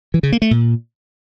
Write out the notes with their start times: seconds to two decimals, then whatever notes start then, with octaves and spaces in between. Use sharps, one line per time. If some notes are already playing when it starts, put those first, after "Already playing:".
0.14 E3
0.23 C#3
0.32 A#3
0.42 A3
0.51 A#2